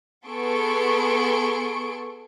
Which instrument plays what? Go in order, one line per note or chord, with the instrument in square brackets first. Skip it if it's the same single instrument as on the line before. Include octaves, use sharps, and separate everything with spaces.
[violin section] B3 G#4 A4 C6 C#6 D7